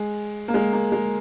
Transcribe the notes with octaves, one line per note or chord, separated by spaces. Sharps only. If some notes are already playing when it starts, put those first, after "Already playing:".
Already playing: G#3
A#3
G#3
A#3
G#3